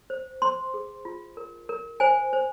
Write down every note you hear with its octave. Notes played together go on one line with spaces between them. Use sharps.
C5
C5 C6
G#4
F4
A#4
A#4
C5 G#5
C5